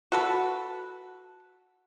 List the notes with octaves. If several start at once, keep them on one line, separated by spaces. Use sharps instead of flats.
F#4 A4 B4